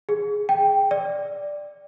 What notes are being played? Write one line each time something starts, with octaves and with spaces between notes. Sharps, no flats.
G#4
G5
D5